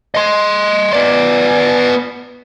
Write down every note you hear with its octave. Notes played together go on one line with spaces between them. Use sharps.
D#5 C6
B3 D5